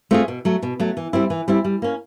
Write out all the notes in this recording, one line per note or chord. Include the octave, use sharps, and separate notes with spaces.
A3 C4 F4 G#4
B2
F#3 A3
B2
F#3 A3
E3
G3 C4 E4
E3
G3 C4 E4
G3
A#3 C#4